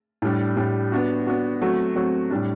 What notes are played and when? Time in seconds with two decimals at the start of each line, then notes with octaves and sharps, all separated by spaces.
0.22 A2 G3 D4
0.56 A2 G3 D4
0.92 B3 D4 F#4
1.27 B3 D4 F#4
1.61 F#3 A3 C4 F#4
1.96 F#3 A3 C4 F#4
2.30 A2 G3 D4